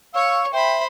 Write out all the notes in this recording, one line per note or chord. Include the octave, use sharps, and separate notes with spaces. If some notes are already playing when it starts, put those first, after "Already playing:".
C#5 F5 C#6 E6
C5 E5 G5 B5